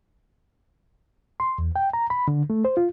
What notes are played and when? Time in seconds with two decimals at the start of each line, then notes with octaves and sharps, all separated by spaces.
1.40 C6
1.58 E2
1.76 G5
1.93 A#5
2.10 B5
2.28 D3
2.50 A3
2.65 C5
2.77 F4